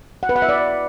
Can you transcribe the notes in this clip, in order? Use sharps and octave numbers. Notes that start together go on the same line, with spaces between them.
F#5
B4
F#5
E5
D5